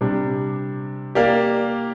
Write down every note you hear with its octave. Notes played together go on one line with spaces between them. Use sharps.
C3 G3 D4 G4
A#3 G4 A#4 D5 F5